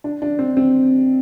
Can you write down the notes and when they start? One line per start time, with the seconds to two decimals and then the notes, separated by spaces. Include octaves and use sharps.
0.04 D4
0.22 D4
0.39 C4
0.57 C4